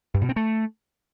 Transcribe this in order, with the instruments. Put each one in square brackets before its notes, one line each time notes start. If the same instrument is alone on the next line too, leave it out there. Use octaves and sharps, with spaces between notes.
[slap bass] G2
B2
C4
A3